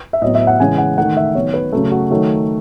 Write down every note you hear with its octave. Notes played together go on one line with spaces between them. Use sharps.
E5
A2 F#3 B3 D#5
E5
F#5
C#3 E3 G#3 G#5
F#5
D#3 A3 F#5
E5
D#3 F#3 B3 C#5
B4
C#3 F#3 A3
F#4
D#3 F#3 A3